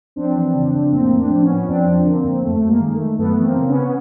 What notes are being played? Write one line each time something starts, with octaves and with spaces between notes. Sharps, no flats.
F2 C4 D4
E3
C#3
F2
A2 A#3 C4
A2
C4 D4
F3
B3 C#4
F3
F2 C4 D4
F3
D3 A#3 C4
F2
F#2 A3
F#2
G#3 A#3
D#3
A3
D#3
F#2 A3 B3
E3
A#3 C4
C#3
B3 C#4